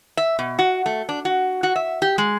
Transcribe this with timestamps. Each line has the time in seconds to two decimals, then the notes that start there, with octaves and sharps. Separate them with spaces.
0.17 E5
0.39 B2
0.59 F#4
0.86 A3
1.09 D4
1.25 F#4
1.63 F#4
1.76 E5
2.02 G4
2.18 G#3